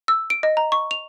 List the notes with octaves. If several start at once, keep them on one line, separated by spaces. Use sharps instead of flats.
E6
D7
D#5
A#5
C#6
F7